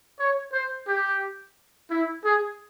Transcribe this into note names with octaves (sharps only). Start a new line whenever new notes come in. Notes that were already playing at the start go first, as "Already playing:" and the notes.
C#5
C5
G4
E4
G#4